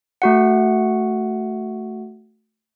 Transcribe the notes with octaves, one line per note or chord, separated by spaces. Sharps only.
A3 F#4 F#5